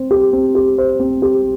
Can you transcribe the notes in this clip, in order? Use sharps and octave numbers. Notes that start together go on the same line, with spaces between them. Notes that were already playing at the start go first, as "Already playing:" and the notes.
Already playing: C4 C5
G4
C4
G4
C5
C4
G4